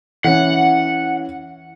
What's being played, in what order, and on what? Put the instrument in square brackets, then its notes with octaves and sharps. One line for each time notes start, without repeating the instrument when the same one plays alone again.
[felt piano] E3 C#4 [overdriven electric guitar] F#5